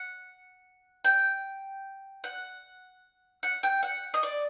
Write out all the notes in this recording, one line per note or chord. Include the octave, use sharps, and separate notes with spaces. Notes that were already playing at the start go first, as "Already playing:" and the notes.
Already playing: F#5
G5
F#5
F#5
G5
F#5
D#5
D5